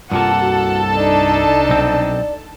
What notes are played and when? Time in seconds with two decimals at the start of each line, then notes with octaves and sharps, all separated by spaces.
0.12 C2 G2 C3 A#3 F4 A4 F#5 A5
0.40 F#4
0.96 D4 D#4 D5
1.69 B1 C4